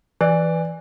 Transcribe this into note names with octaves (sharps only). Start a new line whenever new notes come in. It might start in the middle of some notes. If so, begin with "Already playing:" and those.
E3 D5